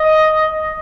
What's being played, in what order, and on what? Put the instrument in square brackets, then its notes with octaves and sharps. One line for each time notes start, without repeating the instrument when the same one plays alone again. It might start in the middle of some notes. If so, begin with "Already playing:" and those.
Already playing: [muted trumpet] D#5